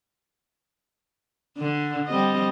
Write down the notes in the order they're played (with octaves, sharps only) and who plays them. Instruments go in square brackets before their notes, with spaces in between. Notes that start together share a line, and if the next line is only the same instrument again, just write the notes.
[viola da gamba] D3
G3 C4 D#5